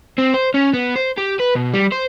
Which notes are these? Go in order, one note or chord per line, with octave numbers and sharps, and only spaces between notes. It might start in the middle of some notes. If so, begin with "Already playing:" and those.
C4
C5
C#4
B3
C5
G4
B4
B2
G3
C5